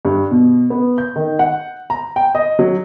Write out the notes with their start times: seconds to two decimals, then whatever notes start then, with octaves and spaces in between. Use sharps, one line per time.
0.05 G2
0.31 B2
0.70 B3
0.98 G6
1.16 D#3
1.39 F#5
1.90 A#5
2.16 G5
2.35 D#5
2.59 F#3